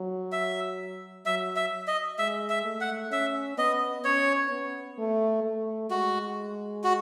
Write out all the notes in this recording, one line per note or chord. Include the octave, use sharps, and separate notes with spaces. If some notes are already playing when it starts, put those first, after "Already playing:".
Already playing: F#3
E5
F#3 E5
E5
D#5
G#3 E5
E5
A3
F#5
C#4 E5
B3 D#5
C#4 C#5
B3
A3
A3
G#3 F#4
F#4